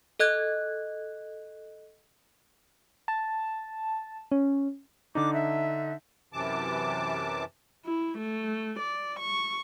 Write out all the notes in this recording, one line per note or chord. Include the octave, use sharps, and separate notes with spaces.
A4 D#5 F#6 G#6
A5
C#4
D3 D4 D#4 D6
E5
F#2 C3 E3 A5 D6
E4
A3
D5
C#6